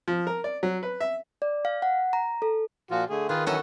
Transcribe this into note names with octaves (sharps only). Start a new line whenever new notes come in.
F3
A#4
D5
F#3
B4
E5
D5
F5
F#5
A#5
A4
A#2 F3 F4 F#4
D3 A3 G#4
D#3 F4 G#4 B4
E3 F#3 B3 C#4 F#4 A4